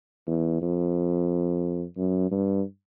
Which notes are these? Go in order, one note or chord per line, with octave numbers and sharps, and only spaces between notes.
E2
F2
F#2
G2